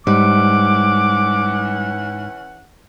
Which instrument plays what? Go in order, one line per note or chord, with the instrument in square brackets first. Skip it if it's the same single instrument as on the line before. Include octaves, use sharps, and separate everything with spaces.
[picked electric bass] G#2 [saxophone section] E3 C#4 F#5 [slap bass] G3 [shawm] D6